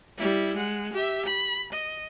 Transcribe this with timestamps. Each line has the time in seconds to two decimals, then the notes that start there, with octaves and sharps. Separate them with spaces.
0.17 G3 E4
0.56 G#3 F#5
0.93 G4 E5
1.25 B5
1.72 D#5